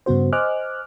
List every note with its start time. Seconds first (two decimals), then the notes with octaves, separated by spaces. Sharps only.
0.06 G2 C#3 B3 F#4 C5
0.33 C5 D#5 G#5 D6 F6 F#6